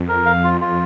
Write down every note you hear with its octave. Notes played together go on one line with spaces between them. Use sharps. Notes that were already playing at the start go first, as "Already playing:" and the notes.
Already playing: F2
A#4
F5
F4
F4